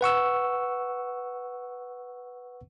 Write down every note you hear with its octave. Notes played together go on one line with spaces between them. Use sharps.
B4 F#5 C#6 E6